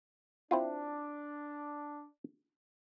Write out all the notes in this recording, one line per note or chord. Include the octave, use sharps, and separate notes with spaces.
C4 D4 E4 F4